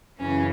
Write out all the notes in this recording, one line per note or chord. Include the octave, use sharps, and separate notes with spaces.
F#2 C#3 E3 C#4